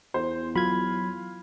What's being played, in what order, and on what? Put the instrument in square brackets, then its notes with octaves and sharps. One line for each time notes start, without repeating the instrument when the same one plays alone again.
[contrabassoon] E2 [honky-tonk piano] C5
[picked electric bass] F#3 [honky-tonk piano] F4 [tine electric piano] B5 G#6